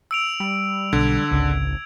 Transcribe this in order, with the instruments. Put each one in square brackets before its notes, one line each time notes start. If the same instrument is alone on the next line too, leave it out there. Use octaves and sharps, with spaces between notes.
[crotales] E6 D7 F7
[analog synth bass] G3
[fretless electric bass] B1 [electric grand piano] D3 [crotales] G#6
[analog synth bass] G#1 [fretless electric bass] C#2